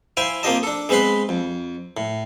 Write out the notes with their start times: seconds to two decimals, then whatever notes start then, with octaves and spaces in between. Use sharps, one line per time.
0.17 E4 C5 F5 G5 G#5
0.43 A#3 C4 F4 G4 D#5 A5
0.63 D4 A4
0.89 G#3 B3 C4 B4 B5 C6
1.29 F2
1.97 A2